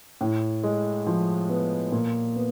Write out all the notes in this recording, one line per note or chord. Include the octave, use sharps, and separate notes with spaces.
A2
G#3
F3
B3
A#2
B3